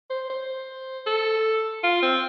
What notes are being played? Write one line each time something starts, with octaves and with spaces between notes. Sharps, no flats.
C5
C5
A4
F4
C4